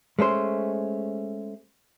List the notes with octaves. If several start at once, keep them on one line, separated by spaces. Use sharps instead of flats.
G#3 A3 C#4 C5